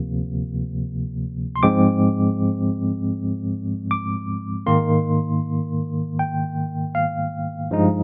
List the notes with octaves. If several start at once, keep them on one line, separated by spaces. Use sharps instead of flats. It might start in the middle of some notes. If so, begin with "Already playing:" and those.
Already playing: D2 C3 F3 A#3
C6
G#2 F3 G#3 C4 D6
D6
G#2 D#3 A#3 C6
G5
F5
G2 F3 G#3 D#4